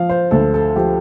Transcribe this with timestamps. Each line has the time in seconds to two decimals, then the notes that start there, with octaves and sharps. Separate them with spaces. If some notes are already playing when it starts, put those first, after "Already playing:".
Already playing: F3 F5
0.09 C5
0.31 D2 A4
0.54 A4
0.76 F3 G4